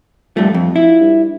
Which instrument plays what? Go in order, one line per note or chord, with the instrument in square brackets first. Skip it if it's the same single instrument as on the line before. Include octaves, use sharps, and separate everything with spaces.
[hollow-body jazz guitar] G2 A3 [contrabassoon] F3
[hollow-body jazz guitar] F2
E4
[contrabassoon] G2